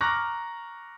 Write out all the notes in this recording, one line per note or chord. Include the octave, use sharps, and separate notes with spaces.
A#5 C#6 D6 F6 F#6 A#6